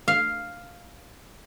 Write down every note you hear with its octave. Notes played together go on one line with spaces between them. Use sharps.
F5